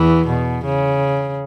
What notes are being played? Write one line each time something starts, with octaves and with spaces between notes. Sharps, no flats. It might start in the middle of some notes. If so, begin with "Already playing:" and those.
Already playing: E2 E3
B2
C#3